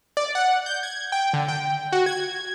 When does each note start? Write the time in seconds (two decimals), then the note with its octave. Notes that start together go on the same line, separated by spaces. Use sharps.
0.17 D5
0.35 F#5
0.66 G6
0.83 G#6
1.12 G5
1.33 D3
1.48 G5
1.92 F#4
2.06 G#6